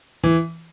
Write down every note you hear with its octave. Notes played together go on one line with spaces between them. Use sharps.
E3